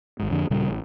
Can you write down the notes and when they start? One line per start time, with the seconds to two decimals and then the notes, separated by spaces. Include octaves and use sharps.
0.19 G#1 G#2
0.31 F2 D3
0.50 D#1 A#2 C#3 G3
0.69 A1